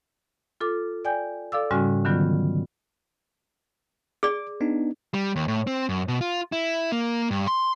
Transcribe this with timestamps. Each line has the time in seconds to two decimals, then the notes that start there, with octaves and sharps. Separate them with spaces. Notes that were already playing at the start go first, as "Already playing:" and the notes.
0.61 F4 A4 D6
1.05 D5 G5 G#5 G6
1.52 A4 D5 F5 D6 E6
1.71 G#2 C#3 G3 C#4 F#4 G#5
2.05 D3 D#3 F#3 B3 F4
4.23 G#4 D5 D6
4.61 B3 D4 D#4
5.14 G3
5.36 D#2
5.48 A2
5.67 C4
5.89 F#2
6.08 B2
6.21 F4
6.52 E4
6.92 A#3
7.31 G2
7.47 C6